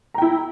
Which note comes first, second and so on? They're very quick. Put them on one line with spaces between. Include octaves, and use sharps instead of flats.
A#5 G5 E4